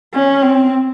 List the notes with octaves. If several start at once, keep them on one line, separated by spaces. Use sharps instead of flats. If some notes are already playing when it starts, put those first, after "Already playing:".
C#4
C4